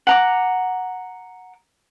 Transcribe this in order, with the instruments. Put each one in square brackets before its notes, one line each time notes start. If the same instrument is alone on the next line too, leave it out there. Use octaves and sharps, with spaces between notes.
[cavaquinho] F#5 A#5 D6